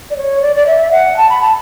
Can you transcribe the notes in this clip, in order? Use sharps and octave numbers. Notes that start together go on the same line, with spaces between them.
D5
C#5
D5
D5
E5
F#5
A5
B5
A5